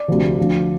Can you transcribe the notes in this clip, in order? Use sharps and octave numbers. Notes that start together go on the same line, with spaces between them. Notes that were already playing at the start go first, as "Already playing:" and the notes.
Already playing: D5
D2 C3 F3
D2 D3 F3